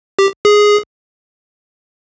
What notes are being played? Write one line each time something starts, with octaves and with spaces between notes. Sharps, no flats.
G4
G#4